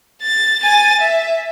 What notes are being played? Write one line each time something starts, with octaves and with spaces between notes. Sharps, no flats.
A6
G#5 A6
E5